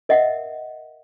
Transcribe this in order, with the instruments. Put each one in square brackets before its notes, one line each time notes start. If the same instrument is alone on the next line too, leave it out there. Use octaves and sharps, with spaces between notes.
[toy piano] A#4 D#5 E5 F#5